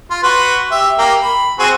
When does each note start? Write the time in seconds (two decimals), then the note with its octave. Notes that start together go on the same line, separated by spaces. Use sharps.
0.10 F4
0.23 F#4 B4 C6
0.72 G4 E5
0.98 A#3 G4 G5
1.22 B5
1.59 C4 F#4 G#4